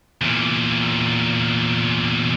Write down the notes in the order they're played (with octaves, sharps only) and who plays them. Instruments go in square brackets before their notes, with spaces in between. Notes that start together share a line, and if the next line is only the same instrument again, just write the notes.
[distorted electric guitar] E2 A#2